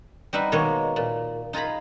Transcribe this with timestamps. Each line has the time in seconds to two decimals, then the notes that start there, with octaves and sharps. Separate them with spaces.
0.33 G3 C4 D#4 B4 E5 F#5
0.52 B2 D#3 G#3 A#3 C#5
0.96 A#2
1.53 D#4 F4 G#4 A#5 B5